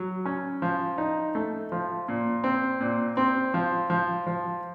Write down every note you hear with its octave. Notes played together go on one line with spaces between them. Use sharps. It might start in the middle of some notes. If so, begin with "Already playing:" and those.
Already playing: F#3
C#4
F3
D#4
A3
F3
A#2
C4
A#2
C4
F3
F3
F3